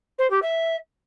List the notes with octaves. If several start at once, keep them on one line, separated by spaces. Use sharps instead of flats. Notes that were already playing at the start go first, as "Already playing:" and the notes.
C5
G4
E5